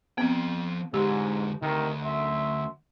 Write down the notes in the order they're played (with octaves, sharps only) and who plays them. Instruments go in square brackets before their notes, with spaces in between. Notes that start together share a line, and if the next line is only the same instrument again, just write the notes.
[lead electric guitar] F3 G5 [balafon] B3 C4
[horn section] G#2 [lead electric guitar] D3 G#3 [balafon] G4
[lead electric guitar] D2 [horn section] C3 D#3
[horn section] F#2 E5 C6